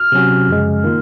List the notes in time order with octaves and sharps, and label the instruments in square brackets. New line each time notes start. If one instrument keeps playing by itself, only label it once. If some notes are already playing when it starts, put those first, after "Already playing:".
Already playing: [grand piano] F6
[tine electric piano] C3 F#3 C#4 F#4
F#2 C#3 F3 G#3
D#3 A#3 F4